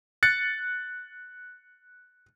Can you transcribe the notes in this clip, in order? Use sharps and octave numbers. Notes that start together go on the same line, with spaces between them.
F#6 A6 C#7